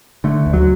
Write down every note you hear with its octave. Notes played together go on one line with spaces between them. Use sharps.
D3 A3
D2
F#3